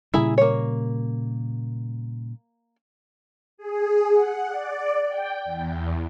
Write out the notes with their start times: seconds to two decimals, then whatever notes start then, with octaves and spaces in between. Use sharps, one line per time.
0.14 A#2 C#3 G3 E4 G#4 A#5
0.38 A#3 C#5
3.58 G#4
4.11 F#5
4.49 D5
5.09 G5
5.45 E2